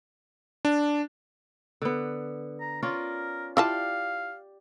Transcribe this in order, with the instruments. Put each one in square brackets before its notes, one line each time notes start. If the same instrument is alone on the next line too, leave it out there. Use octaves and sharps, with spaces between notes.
[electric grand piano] D4
[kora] D3 B3
[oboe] A#5
[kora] C#4 F4 D5 [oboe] A#4
[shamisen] E4 F4 A5 [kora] G4 D5 [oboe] F5